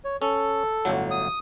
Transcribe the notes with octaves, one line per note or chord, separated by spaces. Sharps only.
C#5
C#4 A4
G1 A2 F#3
D#6